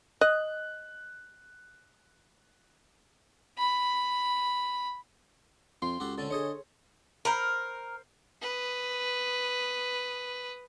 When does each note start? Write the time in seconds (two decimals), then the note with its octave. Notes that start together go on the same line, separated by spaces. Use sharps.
0.21 D#5 F#6
3.58 B5
5.82 F2 F4 G5 C6
6.00 C#2 F#4 G4 A4
6.18 D3 C4 C#4 A4
6.31 D3 G#4 C5 C#5 D#5 A5
7.25 A#4 C5 A#5 B5
8.41 B4 D#6